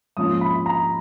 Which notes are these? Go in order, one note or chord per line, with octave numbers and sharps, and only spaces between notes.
G#2 F3 A#3 C#4 D#6
B5
A#5